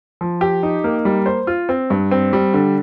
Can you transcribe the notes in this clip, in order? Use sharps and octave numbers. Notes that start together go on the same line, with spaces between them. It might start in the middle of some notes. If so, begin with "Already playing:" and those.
F3
G4
D#4
A#3
G3
C5
F4
C4
G2
C4
G3
D3